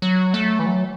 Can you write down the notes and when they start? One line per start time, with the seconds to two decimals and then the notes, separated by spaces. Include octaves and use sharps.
0.02 F#3
0.34 A3
0.59 E3
0.66 F#3